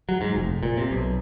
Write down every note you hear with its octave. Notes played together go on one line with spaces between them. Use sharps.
F#3
G#2
F1
A#2
C3
B1